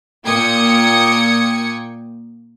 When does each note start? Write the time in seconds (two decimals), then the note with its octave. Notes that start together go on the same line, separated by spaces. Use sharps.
0.25 A#2 A#3 G5 D#6 G#6 C#7